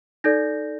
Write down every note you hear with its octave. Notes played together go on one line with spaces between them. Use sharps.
D#4 A4 D5 G6 A#6